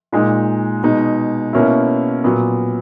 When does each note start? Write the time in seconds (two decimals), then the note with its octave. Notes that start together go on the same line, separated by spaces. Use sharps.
0.12 A#2 G#3 D#4
0.83 B2 G#3 D#4
1.53 B2 A#3 C#4 E4
2.24 A#2 F#3 B3